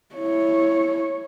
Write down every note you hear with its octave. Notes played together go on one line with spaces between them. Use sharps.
E4 C#5